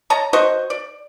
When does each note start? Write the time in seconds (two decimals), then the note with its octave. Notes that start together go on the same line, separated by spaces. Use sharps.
0.10 C#5 D#5 A5 A#5
0.33 F#4 C5 D#5 C#6
0.70 D5